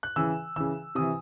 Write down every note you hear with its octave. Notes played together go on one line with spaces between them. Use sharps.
F#6
C#3 E3 E6
C#3 E3 E6
C3 E3 D#6